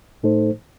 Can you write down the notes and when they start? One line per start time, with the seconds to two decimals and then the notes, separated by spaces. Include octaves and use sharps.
0.23 A2 A3 D#4 A4 C5